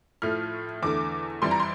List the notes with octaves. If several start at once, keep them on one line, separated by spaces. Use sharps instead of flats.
A2 F3 A3 F6
E2 D3 A3 D6
F2 E3 G3 C6
A#5
C6